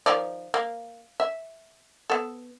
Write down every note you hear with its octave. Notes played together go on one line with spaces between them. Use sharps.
D#3 F3 D5
A#3
E5
B3 A4